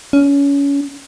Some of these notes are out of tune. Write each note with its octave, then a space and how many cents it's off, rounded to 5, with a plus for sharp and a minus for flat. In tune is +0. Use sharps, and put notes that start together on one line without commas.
C#4 +25